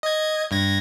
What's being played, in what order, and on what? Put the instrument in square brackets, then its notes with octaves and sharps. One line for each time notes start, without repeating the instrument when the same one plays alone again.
[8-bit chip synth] D#5 G#6
G2 G#6 A#6